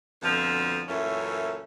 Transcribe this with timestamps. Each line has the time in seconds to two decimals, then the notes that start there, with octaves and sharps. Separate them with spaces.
0.22 F2 B2 D3 F3
0.88 F#2 A#2 E3 A3 C#4